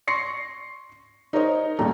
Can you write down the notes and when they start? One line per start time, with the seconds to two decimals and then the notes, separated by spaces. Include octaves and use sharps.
0.08 C6 C#6 A#6 C7 C#7
1.33 D#4 A#4 C5 C#5 D#5
1.79 A1 D#2 A#2 G3 A3 A#5